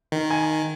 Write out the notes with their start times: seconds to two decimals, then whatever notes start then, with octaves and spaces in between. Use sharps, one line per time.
0.12 D#3
0.30 G#5